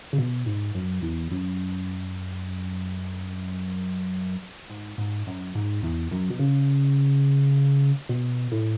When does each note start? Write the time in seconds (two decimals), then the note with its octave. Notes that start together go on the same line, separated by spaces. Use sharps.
0.13 C#3
0.18 B2
0.46 G#2
0.74 F#2
1.02 E2
1.31 F#2
4.70 G#2
4.98 G#2
5.27 F#2
5.55 G#2
5.83 E2
6.11 F#2
6.30 B2
6.39 C#3
8.09 B2
8.52 A2